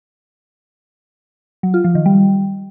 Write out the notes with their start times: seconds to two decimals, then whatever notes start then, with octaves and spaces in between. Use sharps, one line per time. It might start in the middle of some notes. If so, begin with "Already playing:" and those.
1.63 F#3
1.74 F4
1.84 F3
1.95 D#3
2.06 G3